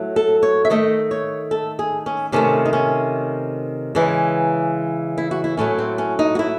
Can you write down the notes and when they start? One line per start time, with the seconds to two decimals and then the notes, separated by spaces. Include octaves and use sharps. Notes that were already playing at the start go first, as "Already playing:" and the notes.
Already playing: A2 F#3 A3
0.16 A4
0.43 C#5
0.65 E5
0.70 D#3 A3 D#5
1.11 C#5
1.51 A4
1.79 G#4
2.06 C#4
2.32 C3 D#3 A3 C#4
2.66 D#4
2.73 C#4
3.95 C#3 E3 G#3
5.18 E4
5.31 F#4
5.44 E4
5.57 A2 F#3 A3 C#4
5.79 C4
5.98 C#4
6.19 D#4
6.35 F#4
6.39 E4